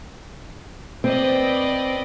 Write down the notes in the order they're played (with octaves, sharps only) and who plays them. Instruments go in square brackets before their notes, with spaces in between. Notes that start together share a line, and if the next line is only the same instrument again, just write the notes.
[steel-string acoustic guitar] C4 [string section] B4 D5 D#5